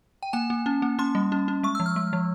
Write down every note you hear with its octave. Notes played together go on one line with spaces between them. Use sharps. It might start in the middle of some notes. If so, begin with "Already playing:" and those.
G5
A#3 G#5
A#3
C#4
A#3
C#4 C6
G3
C#4
C#4
G#3 C#6
F3 E6
F6
G#3
F3